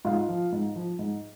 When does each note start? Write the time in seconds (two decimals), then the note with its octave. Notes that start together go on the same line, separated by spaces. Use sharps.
0.05 G#2 F4 F5
0.29 F3
0.52 G#2
0.76 F3
0.99 G#2